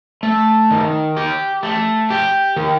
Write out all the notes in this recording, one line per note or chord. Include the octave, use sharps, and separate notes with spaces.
A3
D#3
G4
A3
G4
D#3